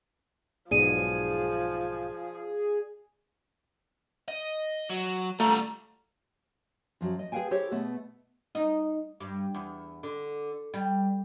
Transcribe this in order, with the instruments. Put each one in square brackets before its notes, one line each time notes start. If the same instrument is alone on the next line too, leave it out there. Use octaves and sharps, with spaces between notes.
[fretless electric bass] B1 G#2 [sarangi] F3 [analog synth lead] G#4 [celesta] D5 D#7
[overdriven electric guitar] D#5
F#3
[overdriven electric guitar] G3 F4 [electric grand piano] A3 [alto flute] A#5
[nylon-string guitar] F#2 F3 F#3
D#5
G#4 B4 C5 F5 G5 G#5
E4 G4 A4 C5 C#5
B2 A3 B3
[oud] D#4
G2
E2
D3
G3